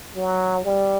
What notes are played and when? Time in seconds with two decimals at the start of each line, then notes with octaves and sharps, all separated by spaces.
0.16 F#3
0.64 G3